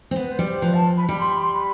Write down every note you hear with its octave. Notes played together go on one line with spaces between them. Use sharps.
C4
B3 B4
C5
G3
C5
F3 B4
A5
B5
G3 B5
C6
B5
C6
B5